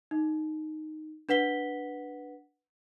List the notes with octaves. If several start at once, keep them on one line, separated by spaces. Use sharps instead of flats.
D#4
D4 B4 F#5 B6 G7